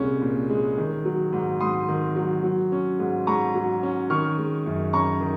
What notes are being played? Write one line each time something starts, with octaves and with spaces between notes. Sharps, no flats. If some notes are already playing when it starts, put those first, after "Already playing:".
Already playing: C2 A#2 G#3 C#4
A#2
G#3
D#3
F#3
G#2
G#2 C6 D#6
D#3
F#3
F#3
C#4
G#2
G#2 A#5 C#6
F#3
C#4
D#3 C#6 F6
G#3
F#2
C#4 A#5 C#6
D#3